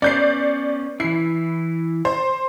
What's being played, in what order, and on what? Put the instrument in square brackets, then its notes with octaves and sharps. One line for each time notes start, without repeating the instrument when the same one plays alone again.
[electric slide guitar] B3 C#4 [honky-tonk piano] D5 G6 C7
[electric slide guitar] E3 E4 [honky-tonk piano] C7
[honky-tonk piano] C5